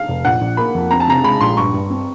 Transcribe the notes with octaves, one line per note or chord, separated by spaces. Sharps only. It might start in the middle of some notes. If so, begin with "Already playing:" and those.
Already playing: F5
F1
A#1 F#5
A#1
A#3 B5
F2
C4 A#5
A5
C3 A#5
G#3 B5
A#1 C6
G2 C#6
G2
C4